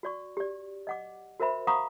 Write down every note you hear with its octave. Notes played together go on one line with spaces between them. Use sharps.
F#4 D5 C#6
G4 D5
D#5 F#5 D6
F#4 A#4 C5 E5 B5
F5 F#5 A#5 B5 C#6 D#6